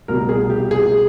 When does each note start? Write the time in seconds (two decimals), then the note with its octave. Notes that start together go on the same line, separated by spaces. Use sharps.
0.08 C2 B2 G3 A#4
0.29 G#4
0.50 G4
0.71 G#4